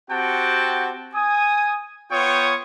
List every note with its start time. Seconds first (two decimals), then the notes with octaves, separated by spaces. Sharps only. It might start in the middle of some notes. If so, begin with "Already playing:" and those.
0.10 C4 F#4 G4 F#5 G5 A5
1.14 G#5 D#6
2.11 B3 F4 C#5 G5 C#6 D#6